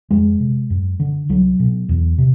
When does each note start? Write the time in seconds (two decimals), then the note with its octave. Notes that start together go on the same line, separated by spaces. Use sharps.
0.11 F2 G#3
0.40 C3
0.70 F#2
1.00 D3
1.29 C2 F#3
1.59 B2
1.89 E2
2.18 C3